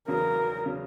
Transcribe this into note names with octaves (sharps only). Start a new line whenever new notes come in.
E2 C#3 F#3 A#4
C#3 F#3